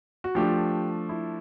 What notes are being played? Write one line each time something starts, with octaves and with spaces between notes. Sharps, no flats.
F#4
F3 A3 D4 G4
E4